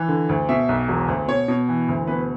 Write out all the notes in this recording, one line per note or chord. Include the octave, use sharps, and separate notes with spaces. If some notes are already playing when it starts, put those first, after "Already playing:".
Already playing: E3
D3
D2
B2 E5
B1
E1
D2
B2 C#5
B2
E3
D2
B2 B4